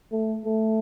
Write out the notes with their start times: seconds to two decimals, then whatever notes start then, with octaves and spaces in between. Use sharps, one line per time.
0.12 A3
0.45 A3